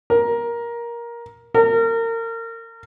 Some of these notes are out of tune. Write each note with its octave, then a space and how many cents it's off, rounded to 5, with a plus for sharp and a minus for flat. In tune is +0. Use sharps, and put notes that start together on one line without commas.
A#4 +15
A#4 -30